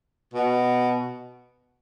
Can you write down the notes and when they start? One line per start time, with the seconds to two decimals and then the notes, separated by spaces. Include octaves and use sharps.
0.34 B2